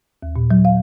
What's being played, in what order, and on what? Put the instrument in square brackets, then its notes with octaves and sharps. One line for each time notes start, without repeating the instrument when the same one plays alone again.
[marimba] D#2
A#2
F#3
F5